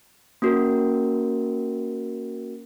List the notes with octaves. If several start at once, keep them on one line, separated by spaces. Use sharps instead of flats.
A#3 C#4 F#4 A#4